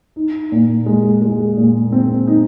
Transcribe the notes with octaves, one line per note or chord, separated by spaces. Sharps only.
D#4
A#2
G#3
G#3
A#2
C4
D#4